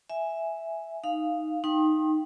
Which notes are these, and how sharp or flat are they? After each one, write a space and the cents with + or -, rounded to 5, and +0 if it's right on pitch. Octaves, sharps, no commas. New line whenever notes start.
E5 +0 G#5 +0
D#4 +0 F5 +0
D#4 +0 G5 -5 C6 +40